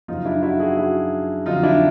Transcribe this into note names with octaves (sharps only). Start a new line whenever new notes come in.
F#2 C#3 F3 D#4 F4
D4 E4
E4 F#4
F#4 G#4
E4 F#4
F2 D3 F#3 D#4 F4
D4 E4